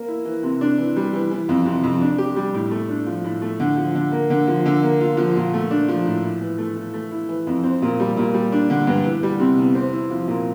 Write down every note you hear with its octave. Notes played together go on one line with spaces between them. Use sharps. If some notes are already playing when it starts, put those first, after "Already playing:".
Already playing: A#3
E4
E3
C3
D4
E3
G3
E3
E3
F2
C3
F2
D4
G4
G3
A2
A3
D4
F3
A2
A3
D3
F3
D3
A#3
D3
F3
D3
A#3
F4
F3
A#2
A3
D4
F3
A2
E4
E3
A3
E3
A3
E4
E3
F2
C4
A#2
G3
A#2
G3
D4
D3
G2
E3
G3
C3
E2
C4
E4
F3
A#2